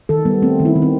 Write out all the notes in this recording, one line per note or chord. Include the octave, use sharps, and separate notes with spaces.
D#3 A4
G3 B3
A3 C4
D#3
E4
D#3
C4